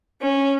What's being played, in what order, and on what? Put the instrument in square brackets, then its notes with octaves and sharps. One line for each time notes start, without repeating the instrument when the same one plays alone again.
[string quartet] C#4